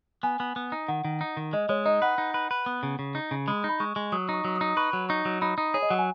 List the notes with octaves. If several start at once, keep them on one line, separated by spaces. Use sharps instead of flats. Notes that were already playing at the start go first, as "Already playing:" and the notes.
B3 G#5
B3
B3
D#4
D#3 F#5
D#3
D#4
D#3
G#3 D#5
G#3 C#5
D#4 D#5
B4 F#5
D#4
B4
B4
B3
C#3
C#3
D#4
C#3
G#3 B5
D#4
B5
G#3 C#6
G#3
F#3 D#6
D#4 C#6
F#3 C#6
D#6
D#4
B4 C#6
F#3
D#4 C#6
F#3
D#4 B5
D#4
G#4 C#5
D#5
F#3 F#5
G#5